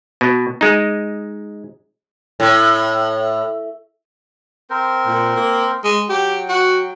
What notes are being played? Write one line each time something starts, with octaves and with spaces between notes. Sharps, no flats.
B2
G#3 D#4
A2
C4 A#4 C5
A#2
A#3
G#3
F#3 G4 G5
F#4